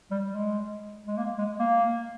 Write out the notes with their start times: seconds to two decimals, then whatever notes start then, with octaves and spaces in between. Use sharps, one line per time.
0.11 G3
0.32 G#3
1.07 G#3
1.17 A#3
1.38 G#3
1.59 A#3